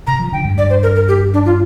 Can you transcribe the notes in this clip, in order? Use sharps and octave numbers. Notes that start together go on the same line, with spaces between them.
C3 A#5
F3
D3 G5
G2
G2 D5
C5
A#4
A#4
G4
D4
F4